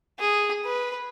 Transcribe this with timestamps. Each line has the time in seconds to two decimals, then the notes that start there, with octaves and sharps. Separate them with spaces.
0.20 G#4
0.65 B4